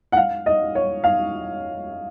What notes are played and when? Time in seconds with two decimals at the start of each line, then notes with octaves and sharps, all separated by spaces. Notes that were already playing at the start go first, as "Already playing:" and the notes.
0.12 F#5
0.17 F5
0.46 D#5
0.75 C#5
1.04 F5